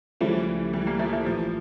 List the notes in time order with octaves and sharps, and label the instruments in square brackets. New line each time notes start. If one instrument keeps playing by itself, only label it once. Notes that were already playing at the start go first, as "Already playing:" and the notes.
[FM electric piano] C#2 C#3 F3 A3 [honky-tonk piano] E3 G3
[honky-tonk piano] E3 G3
G3 A#3
F3 A3
F3 A3
[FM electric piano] A1 A2 E3 [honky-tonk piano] F3